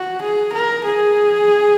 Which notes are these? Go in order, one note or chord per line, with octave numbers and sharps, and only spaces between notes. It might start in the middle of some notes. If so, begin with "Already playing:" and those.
Already playing: F#4
G#4
A#4
G#4